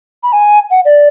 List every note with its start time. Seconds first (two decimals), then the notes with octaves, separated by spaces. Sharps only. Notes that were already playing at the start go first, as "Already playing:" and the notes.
0.23 B5
0.33 G#5
0.71 F#5
0.85 D5